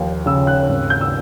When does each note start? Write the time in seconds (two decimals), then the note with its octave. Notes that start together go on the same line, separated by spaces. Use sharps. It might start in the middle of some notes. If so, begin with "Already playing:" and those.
Already playing: D#2 F3
0.26 C#3 E6
0.47 F#6
0.69 G#1
0.90 G6
1.01 E6